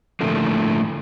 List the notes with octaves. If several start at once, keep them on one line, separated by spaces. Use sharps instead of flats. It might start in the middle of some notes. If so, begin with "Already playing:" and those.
A2 D3 F3 A3 A#3